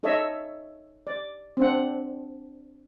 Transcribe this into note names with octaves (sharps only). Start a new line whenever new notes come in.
D#4 A4 C#5 D#5 E5
D5
C4 D4 F#5